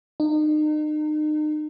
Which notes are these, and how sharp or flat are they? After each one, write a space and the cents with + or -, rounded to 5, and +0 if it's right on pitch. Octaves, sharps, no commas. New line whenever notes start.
D#4 -35